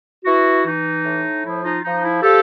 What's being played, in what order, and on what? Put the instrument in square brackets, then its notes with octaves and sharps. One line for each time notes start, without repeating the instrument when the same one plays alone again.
[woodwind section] E3 E4 F#4
E3 D#4
A2
F3 E4
D#4 F4
F3 D#4
E4
F3 G4 A4